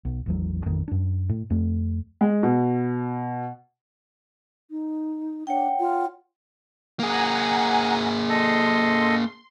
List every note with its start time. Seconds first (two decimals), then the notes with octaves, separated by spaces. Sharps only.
0.05 B1
0.26 A1 E2 F#3
0.66 A1 F2 A2 D#3
0.88 F#2 D4
1.29 A2
1.50 F2 A3
2.21 G#3
2.43 B2
4.70 D#4
5.47 D4 C#5 F#5 G5
5.80 F4
7.00 A#3 G#4 F#5 G#5 A#5
8.29 A4 D#5 C6